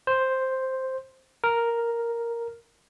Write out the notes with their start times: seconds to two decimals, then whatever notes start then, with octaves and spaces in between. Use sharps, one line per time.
0.07 C5
1.44 A#4